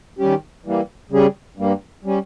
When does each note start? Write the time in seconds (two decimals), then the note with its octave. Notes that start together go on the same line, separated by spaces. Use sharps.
0.19 D#3 G3 C#4 G4
0.65 E3 G3 A#3
1.10 C#3 G3 C#4 G#4
1.57 G2 G3 A#3
2.04 G3 C#4